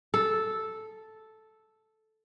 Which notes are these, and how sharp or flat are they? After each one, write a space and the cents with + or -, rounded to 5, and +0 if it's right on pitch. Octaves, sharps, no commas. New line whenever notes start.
A4 -5